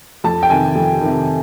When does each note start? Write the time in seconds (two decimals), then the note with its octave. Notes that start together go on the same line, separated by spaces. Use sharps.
0.24 F2 A5
0.43 G5
0.50 C3 D#3 G#5
0.75 F2
1.01 C3 D#3